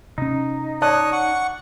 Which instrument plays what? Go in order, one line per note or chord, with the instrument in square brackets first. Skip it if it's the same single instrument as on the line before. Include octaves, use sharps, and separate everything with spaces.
[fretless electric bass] C3 C#4 [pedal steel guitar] D#4
[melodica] C#5 D#6 [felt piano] D5 A5 F#6
[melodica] F#5 C#6